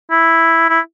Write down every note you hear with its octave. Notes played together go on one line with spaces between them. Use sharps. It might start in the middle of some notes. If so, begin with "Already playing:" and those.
E4
E4